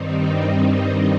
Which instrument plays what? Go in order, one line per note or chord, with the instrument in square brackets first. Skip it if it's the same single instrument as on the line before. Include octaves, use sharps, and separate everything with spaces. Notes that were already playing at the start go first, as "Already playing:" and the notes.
Already playing: [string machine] G2 D#3 G3 C4 D#4